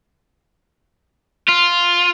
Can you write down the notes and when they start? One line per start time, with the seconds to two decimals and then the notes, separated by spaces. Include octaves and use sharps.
1.48 F4